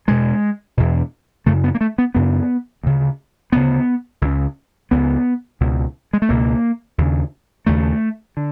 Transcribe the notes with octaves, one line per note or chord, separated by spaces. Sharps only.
E2 B2 G#3
E2 B2
F#2 C#3 A3
B3
A#3
A3
B3
F#2 C#3 B3
D2 C#3
D2 C#3 B3
C#2 C#3
C#2 C#3 B3
C#2 B2
G#3
A3
C#2 B2 A#3
D#2 C#3
D#2 C#3 A3
D3